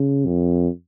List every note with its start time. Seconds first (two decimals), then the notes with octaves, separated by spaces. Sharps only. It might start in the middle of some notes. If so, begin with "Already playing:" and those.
Already playing: C#3
0.26 F2